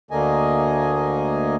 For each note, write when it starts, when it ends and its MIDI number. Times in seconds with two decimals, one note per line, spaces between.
0.11 1.55 38
0.11 1.55 50
0.11 1.55 57
0.11 1.55 58
0.11 1.55 75
0.11 1.55 80